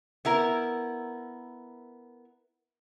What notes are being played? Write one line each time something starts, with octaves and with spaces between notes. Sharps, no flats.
B3 E4 A#4